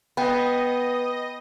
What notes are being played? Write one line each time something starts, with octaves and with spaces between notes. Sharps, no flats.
B3 D#5 G5 B5